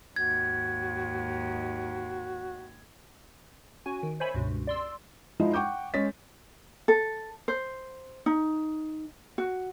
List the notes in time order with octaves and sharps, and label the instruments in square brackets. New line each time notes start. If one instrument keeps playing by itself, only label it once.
[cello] D#2 G#2 [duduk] F#4 [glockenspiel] G#6
[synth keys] C#4 F#4 G#5
D#3
C5 C#5 E5 G#5 B5
C#2 G2 B2
D5 C6 E6
[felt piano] F3 G#3 D#4 E4
F#5 G5 C#6 D6 G6
G#3 C#4 C#5 A6 B6
[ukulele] A4
C5
D#4
F#4